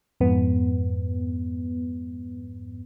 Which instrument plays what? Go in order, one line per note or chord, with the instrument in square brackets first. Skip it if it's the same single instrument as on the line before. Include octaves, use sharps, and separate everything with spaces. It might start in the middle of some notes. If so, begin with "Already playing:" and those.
[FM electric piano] F2 G#2 B3